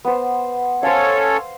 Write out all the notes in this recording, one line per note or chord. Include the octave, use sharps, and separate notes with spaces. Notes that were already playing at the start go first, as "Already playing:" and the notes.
B3 C5
C#4 A4 C5 C#5 F5